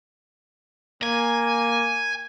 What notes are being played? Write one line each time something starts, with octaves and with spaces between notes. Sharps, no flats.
A#3 G#5